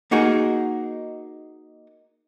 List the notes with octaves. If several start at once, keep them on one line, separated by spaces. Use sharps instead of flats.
A#3 D#4 F#4 G#4 A#4